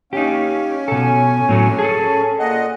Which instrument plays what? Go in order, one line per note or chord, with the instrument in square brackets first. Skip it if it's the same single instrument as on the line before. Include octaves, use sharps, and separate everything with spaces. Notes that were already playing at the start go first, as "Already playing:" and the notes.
[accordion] C#4 [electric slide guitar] D#4 G4 [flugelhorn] F5
[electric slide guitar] B2 A4 [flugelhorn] G#5
[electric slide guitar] A2 F#3 A3
[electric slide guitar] G#4 A4 [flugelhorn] A5
[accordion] A#2 D#5 [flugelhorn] F#5